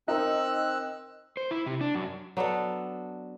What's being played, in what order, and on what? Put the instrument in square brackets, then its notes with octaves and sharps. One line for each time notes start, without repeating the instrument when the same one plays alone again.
[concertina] C4 E6 F#6 [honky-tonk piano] D#4 A#4
[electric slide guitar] C5
E4
C3
D4
F#2
[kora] F#3 B3 D4 A4